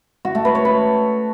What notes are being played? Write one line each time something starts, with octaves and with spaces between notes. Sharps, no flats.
F#4
A3
B4
C#5
B4